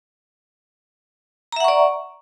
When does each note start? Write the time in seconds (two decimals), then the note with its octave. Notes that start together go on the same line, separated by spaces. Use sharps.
1.52 A#5
1.56 E5
1.60 F#5
1.64 C#6
1.68 D5